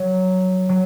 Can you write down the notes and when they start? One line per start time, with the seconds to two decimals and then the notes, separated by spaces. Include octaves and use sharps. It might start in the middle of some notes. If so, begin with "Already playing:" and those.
Already playing: F#3
0.69 F#3